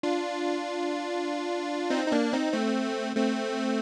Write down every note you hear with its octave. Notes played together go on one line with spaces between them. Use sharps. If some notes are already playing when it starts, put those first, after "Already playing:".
D4 F4
C4 D#4
D#4
A#3 D4
C4 D#4
A3 C4
A3 C4